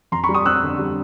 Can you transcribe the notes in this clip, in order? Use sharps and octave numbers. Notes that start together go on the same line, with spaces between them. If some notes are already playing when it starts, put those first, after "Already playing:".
F2 A#5 C6
B5 C#6
G3
C#6 D#6
C4 E6 F#6
D3
G3